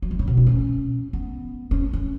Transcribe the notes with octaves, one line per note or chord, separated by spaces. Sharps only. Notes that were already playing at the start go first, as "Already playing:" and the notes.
F#3
D#3
C#3
B2
B3
C#4
B3
C#4
C#4